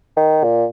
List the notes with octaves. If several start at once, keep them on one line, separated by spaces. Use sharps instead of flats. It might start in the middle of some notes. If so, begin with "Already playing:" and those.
D#3
A#2